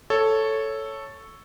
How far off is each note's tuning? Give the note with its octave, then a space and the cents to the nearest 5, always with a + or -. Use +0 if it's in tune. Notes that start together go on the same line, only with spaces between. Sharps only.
A4 +0 C#5 +0